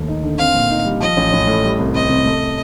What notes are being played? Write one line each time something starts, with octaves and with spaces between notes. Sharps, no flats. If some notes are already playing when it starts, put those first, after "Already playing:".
Already playing: D#2 A3
D#4
D3
C4 F5
A#2
D#4
G3
F3 D#5
A1
A1
A2
G3
C2
C4 D#5
C3
A3